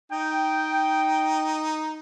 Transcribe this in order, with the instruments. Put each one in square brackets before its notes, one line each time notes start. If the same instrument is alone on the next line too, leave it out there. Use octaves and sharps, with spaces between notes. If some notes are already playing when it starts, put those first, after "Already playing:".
[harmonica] D#4 [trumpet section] G5